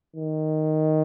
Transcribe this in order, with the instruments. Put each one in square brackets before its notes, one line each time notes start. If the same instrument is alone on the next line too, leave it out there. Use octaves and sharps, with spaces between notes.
[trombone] D#3